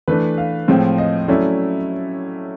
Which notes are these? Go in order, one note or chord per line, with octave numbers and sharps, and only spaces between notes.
E3 A3 D4 B4
F5
A2 F3 G#3 C4
D#5
F#3 A3 C#4 E4 D5